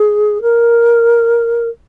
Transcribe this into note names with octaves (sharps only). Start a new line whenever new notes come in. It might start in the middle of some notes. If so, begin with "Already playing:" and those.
Already playing: G#4
A#4